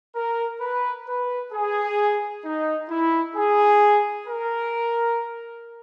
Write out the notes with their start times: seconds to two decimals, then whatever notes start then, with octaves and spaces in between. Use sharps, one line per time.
0.15 A#4
0.61 B4
1.07 B4
1.53 G#4
2.44 D#4
2.90 E4
3.35 G#4
4.27 A#4